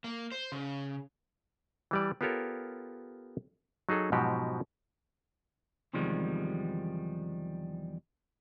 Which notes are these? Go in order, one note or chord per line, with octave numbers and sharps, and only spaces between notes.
A#3
C5
C#3
E3 G3 D5
B3 F4 G4 A4 A#4 C#5
F#3 D#4 G#4 A4
G#2 B2 F3 F#3 F#4 G4
E2 C3 D#3 F3 G3 G#3